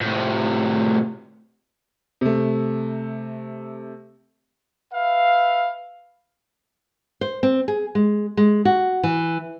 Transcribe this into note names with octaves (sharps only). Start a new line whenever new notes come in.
A2 C3
C3 A3
B4 E5 F5
C5
C4
G#4
G#3
G#3
F#4
E3